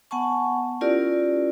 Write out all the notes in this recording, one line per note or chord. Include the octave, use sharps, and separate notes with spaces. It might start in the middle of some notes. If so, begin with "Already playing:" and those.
B3 F#5 G#5 A5 C#6
C#4 E4 F4 G4 A#4 D5